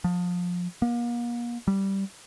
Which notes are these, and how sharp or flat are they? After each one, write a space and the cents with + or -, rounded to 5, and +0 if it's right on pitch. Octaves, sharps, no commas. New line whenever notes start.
F3 +25
A#3 +40
G3 -10